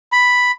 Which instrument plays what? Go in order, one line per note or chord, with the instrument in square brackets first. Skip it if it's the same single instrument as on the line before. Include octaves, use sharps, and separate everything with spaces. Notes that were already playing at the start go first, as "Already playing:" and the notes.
[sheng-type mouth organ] B5